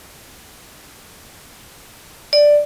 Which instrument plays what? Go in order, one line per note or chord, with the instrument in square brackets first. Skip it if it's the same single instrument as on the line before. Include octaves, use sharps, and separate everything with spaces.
[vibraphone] D5